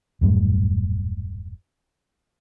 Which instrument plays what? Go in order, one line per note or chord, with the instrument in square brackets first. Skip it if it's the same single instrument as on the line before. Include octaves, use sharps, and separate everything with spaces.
[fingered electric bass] D#1 F#2 A2 G3